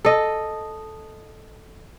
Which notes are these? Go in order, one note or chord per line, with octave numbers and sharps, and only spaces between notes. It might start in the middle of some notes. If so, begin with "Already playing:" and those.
A4 D#5